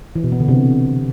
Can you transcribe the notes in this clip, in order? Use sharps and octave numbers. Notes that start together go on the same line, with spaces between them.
E3
B2
B3
D3
C3